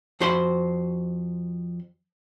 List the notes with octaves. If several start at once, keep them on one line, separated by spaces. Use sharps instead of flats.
F2 F#4 C5 B5 C6